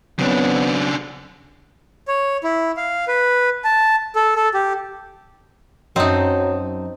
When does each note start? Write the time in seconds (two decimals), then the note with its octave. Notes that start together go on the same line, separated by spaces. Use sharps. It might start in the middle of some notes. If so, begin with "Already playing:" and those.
0.19 C#3 F#3 B3 C4 D4
2.08 C#5
2.44 E4
2.77 F5
3.08 B4
3.64 A5
4.15 A4
4.36 A4
4.54 G4
5.96 F#2 F#3 C4 D#4 D#5 A5